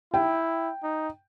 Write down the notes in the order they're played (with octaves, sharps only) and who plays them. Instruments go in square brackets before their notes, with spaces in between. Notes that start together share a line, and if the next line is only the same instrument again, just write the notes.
[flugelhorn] E4 [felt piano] G5
[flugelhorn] D#4